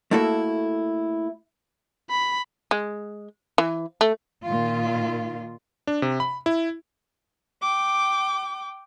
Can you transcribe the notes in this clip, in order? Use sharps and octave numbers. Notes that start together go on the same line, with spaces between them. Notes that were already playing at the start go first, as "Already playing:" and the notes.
A3 A#3 E4 F#4 A4
B5
G#3
E3
A3
A#2 D#3 A#3 F4
D4
C3
B5
E4
G5 D6